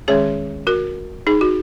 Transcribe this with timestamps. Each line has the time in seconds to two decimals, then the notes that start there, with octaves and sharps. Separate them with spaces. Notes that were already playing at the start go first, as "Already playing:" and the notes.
0.08 D#3 G#3 C#4 G#4 C#5
0.67 F#4 A#4
1.27 D#4 G#4
1.41 F#4